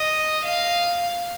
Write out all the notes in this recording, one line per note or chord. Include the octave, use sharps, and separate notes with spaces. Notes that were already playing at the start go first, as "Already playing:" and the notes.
Already playing: D#5
F5